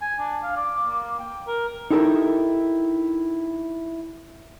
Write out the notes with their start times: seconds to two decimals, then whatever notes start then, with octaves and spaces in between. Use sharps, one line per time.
0.01 G#5
0.19 D4
0.42 F5
0.56 D5
0.87 A#3
1.19 G5
1.47 A#4
1.91 D#4 E4 G4 A4 A#4